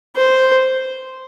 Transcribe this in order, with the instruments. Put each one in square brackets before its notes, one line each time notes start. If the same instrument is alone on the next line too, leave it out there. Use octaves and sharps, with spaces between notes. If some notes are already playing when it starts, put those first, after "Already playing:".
[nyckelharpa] C5